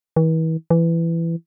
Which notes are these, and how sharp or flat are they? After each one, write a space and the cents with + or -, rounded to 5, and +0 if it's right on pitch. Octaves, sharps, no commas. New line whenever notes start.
E3 -40
E3 +15